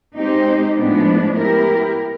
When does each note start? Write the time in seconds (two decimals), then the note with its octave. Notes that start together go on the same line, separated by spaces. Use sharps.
0.16 G#3 C4 D#4 G4 C5
0.76 A2 F3 G#3 B3 D4
1.37 B3 E4 G4 A#4